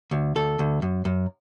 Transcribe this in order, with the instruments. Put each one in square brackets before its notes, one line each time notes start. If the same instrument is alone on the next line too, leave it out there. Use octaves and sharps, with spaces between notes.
[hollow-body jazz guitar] D2
D2 A4
D2
F#2
F#2